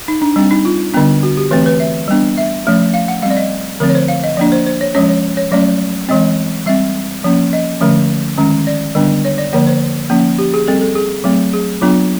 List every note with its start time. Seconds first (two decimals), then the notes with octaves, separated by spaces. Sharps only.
0.08 D#4
0.22 D4
0.36 G3 C4 D4
0.51 D#4
0.65 F4
0.94 D3 G3 B3 D4
1.23 F#4
1.37 G4
1.51 E3 A3 C4 B4
1.66 B4
1.80 E5
2.08 G3 B3 D4
2.38 E5
2.66 F3 A3 C#4
2.94 F5
3.08 F#5
3.22 G3 C4 F5
3.30 D5
3.37 D#5
3.80 D3 F3 A3 C4 A#4
3.89 C#5
3.95 C5
4.08 F5
4.24 D#5
4.37 F3 A#3 D4 D5
4.52 C5
4.66 C5
4.81 C#5
4.95 F3 G#3 C#4 C#5
5.09 C#5
5.37 C#5
5.52 F#3 A3 C#4 D5
6.09 E3 G#3 C4 D#5
6.66 G3 C4 E5
7.24 F3 A#3 C#4
7.53 D#5
7.80 D3 F3 A3 C#4
8.38 D#3 G#3 C#4
8.67 D5
8.95 D3 G3 B3 D4
9.25 C#5
9.38 D5
9.53 D3 F3 A#3 C#5
9.67 C5
10.10 F3 A#3 C#4
10.39 G4
10.54 G#4
10.67 G3 C4 A4
10.81 A4
10.95 G#4
11.24 F#3 A3 C4
11.54 G#4
11.81 F#3 B3 D4 F4